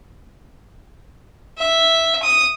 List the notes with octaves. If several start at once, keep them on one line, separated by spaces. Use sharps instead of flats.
E5
D#6